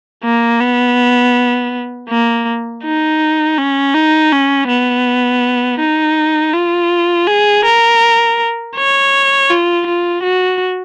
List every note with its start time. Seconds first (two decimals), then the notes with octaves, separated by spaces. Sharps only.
0.24 A#3
0.61 B3
2.09 A#3
2.84 D#4
3.58 C#4
3.95 D#4
4.32 C#4
4.68 B3
5.80 D#4
6.54 F4
7.27 G#4
7.65 A#4
8.76 C#5
9.50 F4
9.87 F4
10.23 F#4